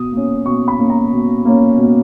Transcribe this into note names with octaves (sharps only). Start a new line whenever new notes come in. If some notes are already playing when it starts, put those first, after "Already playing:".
Already playing: B2 D#6
A#3 C#4
B2 C#6
B5
A#3 C#4
A#5
B2
A#3 C#4
B2